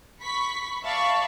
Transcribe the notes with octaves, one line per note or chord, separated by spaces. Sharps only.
B5 C#6 B6
D5 E5 F5 A5 B5 C#6